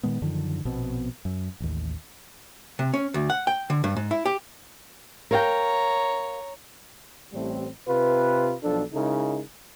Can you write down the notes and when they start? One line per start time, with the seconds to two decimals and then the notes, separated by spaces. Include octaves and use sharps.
0.03 A#2 D#3 G#3 B3
0.22 F#2 D3 D#3 F3
0.65 A#1 B2 B3 C4
1.25 F#2
1.60 A1 D#2
2.79 C3
2.94 C#4
3.14 D2
3.30 F#5
3.47 G5
3.70 D3
3.84 G2
3.96 G#2
4.11 E4
4.26 G4
5.31 A#4 C#5 F5 G5 A#5
7.33 A1 A2 G3 A3 C4
7.87 C3 F4 B4
8.63 B1 F3 D4 A4
8.93 C#3 G#3 D#4 E4 A#4